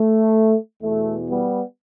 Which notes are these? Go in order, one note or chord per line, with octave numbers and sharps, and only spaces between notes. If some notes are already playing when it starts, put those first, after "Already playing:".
Already playing: A3
E2 B2 A3
G3 B3